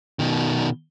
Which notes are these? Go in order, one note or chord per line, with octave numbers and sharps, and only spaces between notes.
B2 D#3